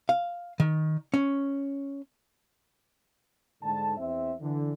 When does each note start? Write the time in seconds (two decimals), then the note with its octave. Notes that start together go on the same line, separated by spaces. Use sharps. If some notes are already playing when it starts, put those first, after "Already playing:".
0.09 F5
0.60 D#3
1.14 C#4
3.62 G#2 D3 A5
3.97 E2 C4 E5
4.41 D3 E3